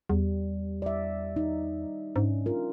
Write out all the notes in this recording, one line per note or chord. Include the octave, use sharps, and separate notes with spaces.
E2 G3
D5 E5
D#4
G#2 C#4 D4
F4 A#4